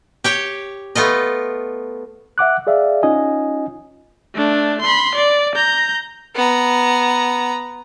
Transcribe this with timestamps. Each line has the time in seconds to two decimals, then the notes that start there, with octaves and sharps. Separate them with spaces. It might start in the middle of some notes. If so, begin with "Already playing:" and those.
0.24 G4 C#5 G5
0.95 A3 B3 F4 D#5
2.38 E5 F#5 D6 F#6
2.67 G#4 D5 E5 F5
3.03 C#4 D#4 F4 D#5 G#5
4.34 A3 D4
4.82 B5 C6
5.15 D5
5.55 A#5 G6
6.35 B3 A#5